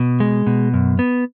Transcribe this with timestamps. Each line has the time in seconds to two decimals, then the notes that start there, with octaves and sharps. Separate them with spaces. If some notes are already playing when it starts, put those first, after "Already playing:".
Already playing: B2
0.20 G#3
0.47 B2
0.74 F#2
0.99 B3